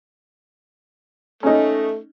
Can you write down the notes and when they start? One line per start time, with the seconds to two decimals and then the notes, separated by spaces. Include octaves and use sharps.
1.43 A3 C#4 D#4